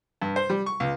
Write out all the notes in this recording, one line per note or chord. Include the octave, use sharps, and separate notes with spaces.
G2
C5
G3
C#6
C#2